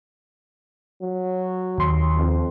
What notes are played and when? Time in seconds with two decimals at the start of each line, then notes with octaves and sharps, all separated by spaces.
1.02 F#3
1.78 D#2 C6
2.16 F2